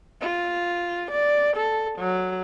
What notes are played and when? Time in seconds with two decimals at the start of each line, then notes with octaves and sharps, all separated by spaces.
0.21 F4
1.11 D5
1.57 A4
1.99 F#3